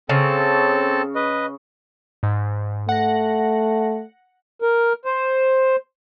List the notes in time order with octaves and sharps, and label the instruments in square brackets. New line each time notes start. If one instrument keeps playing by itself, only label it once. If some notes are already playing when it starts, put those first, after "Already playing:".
[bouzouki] C#3 [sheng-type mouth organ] C4 A4 A5
[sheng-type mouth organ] B4 D#5
[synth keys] G#2
[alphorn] A3 [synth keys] F#5 A#6
[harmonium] A#4
C5